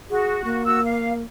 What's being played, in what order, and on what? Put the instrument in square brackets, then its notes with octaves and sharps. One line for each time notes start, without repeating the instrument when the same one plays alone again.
[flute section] F#4 [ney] G#4
[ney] A#3
[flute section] F#4 E6
F5